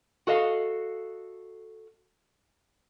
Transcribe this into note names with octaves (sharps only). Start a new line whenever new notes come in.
F#4 A4 D#5 F5